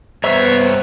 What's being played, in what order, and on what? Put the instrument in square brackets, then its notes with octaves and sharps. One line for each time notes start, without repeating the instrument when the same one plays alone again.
[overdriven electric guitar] G2 C#5 [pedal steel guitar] B3 A#5 [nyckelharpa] C5 [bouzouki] E5